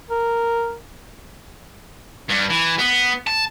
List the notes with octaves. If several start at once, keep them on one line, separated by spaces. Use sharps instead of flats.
A#4
G2
E3
B3
A5